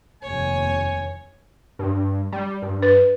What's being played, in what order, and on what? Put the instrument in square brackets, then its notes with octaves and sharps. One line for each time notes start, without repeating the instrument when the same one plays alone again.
[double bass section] F1 D#2 [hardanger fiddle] C#5 [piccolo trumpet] G#5
[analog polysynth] G2
G3
G2
[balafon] B4